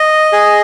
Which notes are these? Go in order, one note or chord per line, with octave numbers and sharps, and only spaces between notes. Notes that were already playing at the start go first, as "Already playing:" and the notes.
Already playing: D#5
G#4